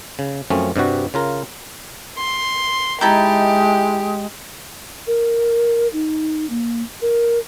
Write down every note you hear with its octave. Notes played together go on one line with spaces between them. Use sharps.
C#3
F#2 F3 A3 C4 C#4
G2 C3 G3 F#4
C#3 F4 A#4
C6
G#3 D#4 E4 G4 A5
A#4
D#4
A#3
A#4